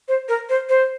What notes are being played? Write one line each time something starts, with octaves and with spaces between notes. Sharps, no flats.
C5
A#4
C5
C5